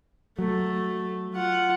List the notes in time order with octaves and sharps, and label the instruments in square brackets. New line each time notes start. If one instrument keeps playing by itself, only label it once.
[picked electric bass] F#3 [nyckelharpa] A3
[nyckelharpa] F4 F#5